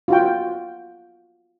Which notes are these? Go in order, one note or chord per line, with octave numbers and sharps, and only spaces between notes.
F4 F#4 G5